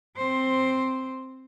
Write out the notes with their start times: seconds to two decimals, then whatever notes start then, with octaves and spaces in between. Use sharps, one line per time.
0.17 C4 C5